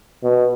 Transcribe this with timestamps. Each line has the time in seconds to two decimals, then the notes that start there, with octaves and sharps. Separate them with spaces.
0.23 B2